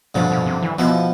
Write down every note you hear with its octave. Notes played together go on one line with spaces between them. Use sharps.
G2 B2 D3 F3
B2
C3
E3
B2 F3 B3 E4